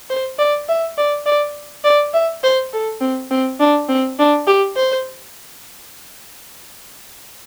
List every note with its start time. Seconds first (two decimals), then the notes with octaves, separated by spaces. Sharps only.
0.10 C5
0.39 D5
0.69 E5
0.98 D5
1.26 D5
1.84 D5
2.14 E5
2.43 C5
2.73 A4
3.01 C4
3.31 C4
3.60 D4
3.89 C4
4.19 D4
4.47 G4
4.76 C5